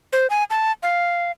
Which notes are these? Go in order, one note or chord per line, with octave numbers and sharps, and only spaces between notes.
C5
G#5
A5
F5